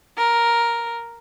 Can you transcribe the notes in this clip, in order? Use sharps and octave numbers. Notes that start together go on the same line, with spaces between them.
A#4